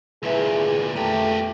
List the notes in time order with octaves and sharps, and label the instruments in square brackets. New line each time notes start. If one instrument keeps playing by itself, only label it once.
[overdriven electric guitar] D2 A#2 [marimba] E4 B4 E5 [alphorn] G#4
[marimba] F2 G5 A#5 [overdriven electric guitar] A#2 G4 [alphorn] A3